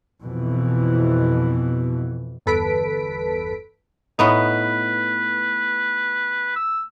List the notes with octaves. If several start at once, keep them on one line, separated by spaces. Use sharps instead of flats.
F2 B2 E3
G1 E2 A4 B4 B6 D7
A2 B3 D#4 B4
E6